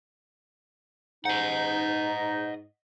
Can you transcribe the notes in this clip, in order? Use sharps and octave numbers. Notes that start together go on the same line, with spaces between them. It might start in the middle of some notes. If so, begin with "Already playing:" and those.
G#2 D#4 D#5 F#5